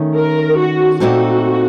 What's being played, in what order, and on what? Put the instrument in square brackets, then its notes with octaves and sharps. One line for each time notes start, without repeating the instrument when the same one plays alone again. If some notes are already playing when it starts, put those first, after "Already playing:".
Already playing: [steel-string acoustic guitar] D#3 A3 C#4
[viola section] A#4
F#4
[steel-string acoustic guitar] A#2 A3 C4 D#4 A4 [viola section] F#4